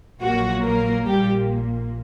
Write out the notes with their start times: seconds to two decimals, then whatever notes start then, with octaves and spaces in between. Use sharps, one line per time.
0.21 A#1 A#2 F#3 A#3 F#4
0.63 A#3 A#4
1.06 A#1 A#2 G3 A#3 G4